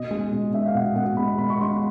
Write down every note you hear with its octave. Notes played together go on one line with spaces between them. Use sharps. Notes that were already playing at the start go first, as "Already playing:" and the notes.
Already playing: B2 D#5
G#3
B2
G#3 E5
F5
B2 F#5
B2 F#5
G#3 B5
B2 B5
C#6
G#3 C6